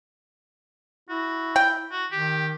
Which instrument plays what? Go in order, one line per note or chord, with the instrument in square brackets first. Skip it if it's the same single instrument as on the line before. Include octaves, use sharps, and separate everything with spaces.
[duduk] E4 [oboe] F#4
[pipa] G5
[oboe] F#4
[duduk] D#3 [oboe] G4